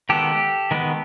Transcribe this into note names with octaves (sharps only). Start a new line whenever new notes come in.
D#3 G#3 B3 G4 A4
D#3 G#3 B3